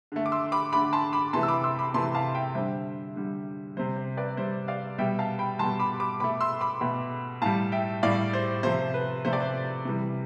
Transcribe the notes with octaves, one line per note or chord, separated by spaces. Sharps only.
D3 A3
D6
C6 E6
B5 D6
D3 A3 B5 D6
A5 C6
B5 D6
C3 E3 A3 A5 C6
E6
B5 D6
C6 E6
B5 D6
C3 E3 A3 A5 C6
F5 A5
E5 G5
D3 G3 C5 E5
D3 G3
C3 G3 C5
C5
B4 D5
C3 G3 C5 E5
D5 F5
B2 G3 E5 G5
F5 A5
G5 B5
B2 G3 A5 C6
B5 D6
B5 D6
B2 A3 B5 D6
C6 E6
B5 D6
B2 A3
A2 G3 F5 A5
E5 G5
A2 G3 D5 F5
C5
C3 F3 A3 C5
B4
C3 F3 A3 C5
D5
C5
C3 E3 G3